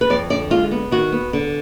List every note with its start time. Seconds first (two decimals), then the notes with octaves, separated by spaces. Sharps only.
0.01 B4
0.10 F2 D5
0.30 D3 D5
0.50 G#3 F4
0.71 B3
0.91 D#3 F#4
1.12 B3
1.33 D3